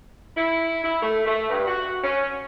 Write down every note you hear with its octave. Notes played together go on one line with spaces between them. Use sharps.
E4
E4
A3
A3
G2
F#4
C#4